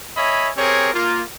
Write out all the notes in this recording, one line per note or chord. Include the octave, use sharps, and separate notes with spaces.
C#5 D#5 E5 G#5 B5
C4 G4 G#4 A#4 C#5
A#3 F4